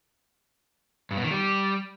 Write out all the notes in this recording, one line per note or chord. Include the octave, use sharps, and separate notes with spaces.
G2
B2
D#3
G3